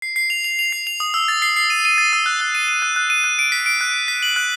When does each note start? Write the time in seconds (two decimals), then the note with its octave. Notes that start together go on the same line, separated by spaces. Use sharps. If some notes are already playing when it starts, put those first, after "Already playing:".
0.02 C7
0.16 C7
0.30 F7
0.44 F7
0.59 F7
0.73 C7
0.87 F7
1.00 D#6
1.14 E6
1.28 A6
1.42 C7
1.56 C7
1.70 D#7
1.85 D#7
1.98 A6
2.13 E6
2.26 F#6
2.41 F#6
2.55 D#7
2.68 D#7
2.82 F#6
2.96 F#6
3.10 D#7
3.24 F#6
3.39 D7
3.52 B6
3.66 D7
3.81 F#6
3.94 D7
4.08 B6
4.23 F#7
4.36 F#6